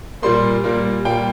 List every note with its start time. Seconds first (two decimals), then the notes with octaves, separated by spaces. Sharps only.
0.22 A#2 G3 A#3 C6
0.64 A#2 G3 A#3
1.05 A#2 G3 A#3 G5